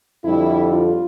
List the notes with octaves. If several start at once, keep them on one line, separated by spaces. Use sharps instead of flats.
F2 D3 G3 E4
F4